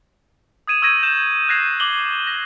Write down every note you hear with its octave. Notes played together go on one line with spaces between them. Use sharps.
D#6 G#6 D#7 E7
C#6 E6 G6 G#6 A#6 D#7
G6 E7
F#6 G#6 A#6 C7 D#7 F7
D6 F#7 G7
A#6